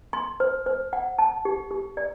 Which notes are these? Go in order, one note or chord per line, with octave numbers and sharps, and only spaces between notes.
C6
C5
C5
F#5
A5
G4
G4
D5